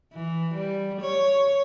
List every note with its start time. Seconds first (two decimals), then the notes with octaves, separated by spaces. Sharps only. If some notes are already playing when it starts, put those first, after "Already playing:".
0.13 E3
0.54 G3
1.01 C#5